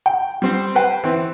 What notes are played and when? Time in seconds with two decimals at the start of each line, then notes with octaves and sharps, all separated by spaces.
0.06 G5
0.42 G3 C4 C5
0.75 B4 C5 G5
1.04 E3 C4